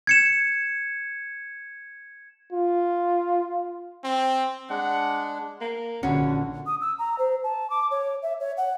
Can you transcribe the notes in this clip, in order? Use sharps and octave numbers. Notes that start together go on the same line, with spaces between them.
G#6 C#7 E7
F4
C4
G#3 D4 F#5
A#3
A#1 D3 C#4 F#4 C#5 B5
D#6
E6
A#5
C5
A5
D6
C#5
E5
C#5
F#5